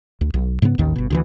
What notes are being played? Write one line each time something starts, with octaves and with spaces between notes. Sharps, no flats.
D2
B1
G#2 C#3 A#3 B3
A1 D#2 D#3
G1 B2
D2 D3 E3